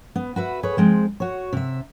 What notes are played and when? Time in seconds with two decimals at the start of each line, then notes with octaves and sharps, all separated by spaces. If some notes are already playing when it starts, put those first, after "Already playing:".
0.16 B3
0.36 F#4 B4 E5
0.63 G#4 B4 C#5
0.77 F3 G#3 C4
1.20 F#4 C#5
1.53 C3 E5